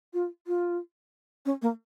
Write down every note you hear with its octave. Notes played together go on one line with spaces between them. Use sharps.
F4
F4
C#4
A#3